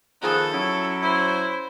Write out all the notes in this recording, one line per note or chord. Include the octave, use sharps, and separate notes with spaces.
D#3 F3 B3 G#4 A4
F#3 C#4 E4
E4 C5